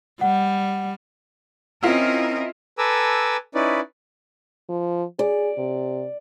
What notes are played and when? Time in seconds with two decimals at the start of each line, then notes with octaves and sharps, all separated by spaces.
0.21 G3 F#5
1.83 C4 C#4 E4 F4 A#4 D#5
2.78 A4 B4 G#5 A#5 D6 E6
3.55 C#4 D#4 E4 B4 D5
4.69 F3
5.19 G#4 D5
5.58 C3